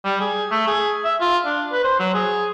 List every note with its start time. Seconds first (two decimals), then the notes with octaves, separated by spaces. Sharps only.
0.05 G3
0.21 G#4
0.51 A3
0.67 G#4
1.05 E5
1.20 F4
1.46 D4
1.72 B4
1.84 C5
1.99 F#3
2.14 G#4